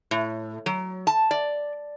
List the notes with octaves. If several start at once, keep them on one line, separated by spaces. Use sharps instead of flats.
A2
F#3
A5
D5